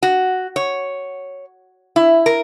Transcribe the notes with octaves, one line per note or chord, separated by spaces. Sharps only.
F#4
C#5
E4
A#4